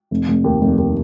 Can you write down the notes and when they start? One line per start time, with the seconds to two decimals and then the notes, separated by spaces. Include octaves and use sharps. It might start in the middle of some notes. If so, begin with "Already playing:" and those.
0.11 F1
0.28 F1
0.44 D#2
0.61 F1
0.78 D#2